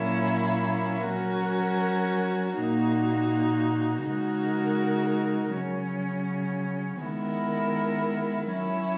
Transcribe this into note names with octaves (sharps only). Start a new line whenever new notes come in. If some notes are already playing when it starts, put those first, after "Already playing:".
Already playing: A#2 F#3 A#3 C#4 E4
F#3 C#4 F#4 A#4
A#2 A#3 D#4 F#4
C#3 G#3 D#4 F#4 A#4
C#3 F#3 C#4
D#3 G#3 B3 E4 A#4
F#3 C#4 E4